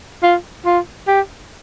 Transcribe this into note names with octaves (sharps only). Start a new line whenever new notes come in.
F4
F4
G4